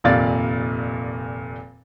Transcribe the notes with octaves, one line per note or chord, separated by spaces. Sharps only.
F1 D#2 A#2 D5 F5 A6